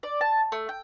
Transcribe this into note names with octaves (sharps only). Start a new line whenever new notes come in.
D5
A5
A3
G5